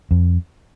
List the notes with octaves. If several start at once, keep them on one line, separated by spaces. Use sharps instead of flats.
F2